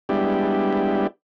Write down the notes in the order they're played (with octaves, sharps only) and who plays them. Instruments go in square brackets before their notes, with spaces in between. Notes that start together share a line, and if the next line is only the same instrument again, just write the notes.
[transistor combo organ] G3 G#3 B3 D4 E4 G4